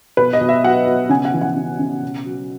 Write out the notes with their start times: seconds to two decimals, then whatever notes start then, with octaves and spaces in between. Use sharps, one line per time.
0.17 B2 B4
0.33 D#5
0.41 B2
0.49 E5
0.63 F#3 F#5
0.87 B2
1.10 C#3 G#5
1.25 F#5
1.34 E3
1.42 F#5
1.57 C#3
1.79 C#3
2.02 B2
2.26 F#3